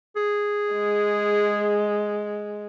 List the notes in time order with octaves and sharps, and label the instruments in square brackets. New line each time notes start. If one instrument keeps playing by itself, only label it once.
[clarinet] G#4
[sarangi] G#3